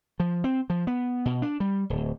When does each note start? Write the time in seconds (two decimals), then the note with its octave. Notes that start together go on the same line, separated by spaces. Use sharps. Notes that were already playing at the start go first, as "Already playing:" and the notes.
0.20 F3
0.44 C4
0.70 F3
0.87 B3
1.25 B2
1.42 D4
1.60 G3
1.90 D1